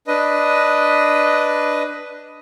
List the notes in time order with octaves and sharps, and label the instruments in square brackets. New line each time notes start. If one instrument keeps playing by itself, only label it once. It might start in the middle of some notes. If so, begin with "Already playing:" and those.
[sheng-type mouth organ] D4 B4 D#5